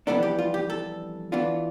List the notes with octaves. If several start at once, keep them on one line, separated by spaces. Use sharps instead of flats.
F2 E3 G3 B3 D4 A4
G4
F4
G4
A4
E3 B3 D4 F4